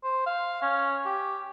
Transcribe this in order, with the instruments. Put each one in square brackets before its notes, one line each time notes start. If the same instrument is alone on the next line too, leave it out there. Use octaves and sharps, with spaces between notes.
[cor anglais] C5
F5
C#4
G4